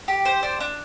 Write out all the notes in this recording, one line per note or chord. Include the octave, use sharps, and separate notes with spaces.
G4
C5
D4
D4